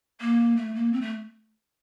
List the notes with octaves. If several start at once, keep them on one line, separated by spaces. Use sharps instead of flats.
A#3
A3
A#3
C4
A3